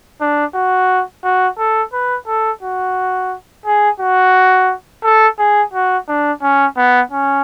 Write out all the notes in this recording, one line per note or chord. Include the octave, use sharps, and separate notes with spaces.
D4
F#4
F#4
A4
B4
A4
F#4
G#4
F#4
A4
G#4
F#4
D4
C#4
B3
C#4